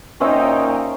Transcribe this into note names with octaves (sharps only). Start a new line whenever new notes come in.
A#2 C#4 D#4 C5 E5 G5